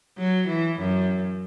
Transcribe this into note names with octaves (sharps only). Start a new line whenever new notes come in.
F#3
E3
F#2